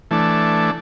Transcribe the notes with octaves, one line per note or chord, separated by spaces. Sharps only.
E3 A3 D4